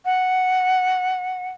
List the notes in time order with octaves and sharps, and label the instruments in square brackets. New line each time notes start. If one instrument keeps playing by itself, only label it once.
[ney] F#5